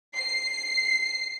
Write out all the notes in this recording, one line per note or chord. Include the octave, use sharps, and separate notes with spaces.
C7